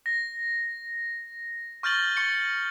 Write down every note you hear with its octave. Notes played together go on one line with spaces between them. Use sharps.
A#6
C#6 F6 G6 A6 F#7 G7
C#6 A6 C#7